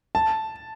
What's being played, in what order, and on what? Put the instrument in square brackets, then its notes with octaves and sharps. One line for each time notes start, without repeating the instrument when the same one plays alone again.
[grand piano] A5